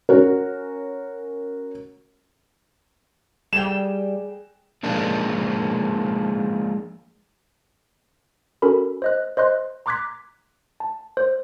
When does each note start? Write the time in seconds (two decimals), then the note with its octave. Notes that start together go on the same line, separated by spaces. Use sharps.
0.09 C#4 F#4 A#4
3.53 G3 G#4 G5 E7
4.83 F3 G#3 A#3 D4 D#4
8.62 C#4 F#4 A4 A#4 B5
9.02 C5 D#5 F#6
9.37 C5 D#5 C6 F#6
9.86 A#5 C6 D6 F#6 G#6 B6
10.80 A5
11.17 C5